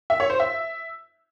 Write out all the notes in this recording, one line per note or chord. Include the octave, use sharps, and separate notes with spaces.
E5
C#5
C5
E5